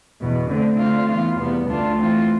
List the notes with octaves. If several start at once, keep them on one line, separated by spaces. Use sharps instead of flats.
E2 B2 B3
D3 A3 C4
D3 A3 C4 F4
E3 B3 F4
E2 C3 G3 B3
D2 D3 A3 D4 F4
E3 A3 C4 F4